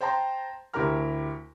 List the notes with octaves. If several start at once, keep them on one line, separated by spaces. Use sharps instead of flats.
C5 G5 A5 A#5 C6
D2 E4 G4 A#4 A#5 F6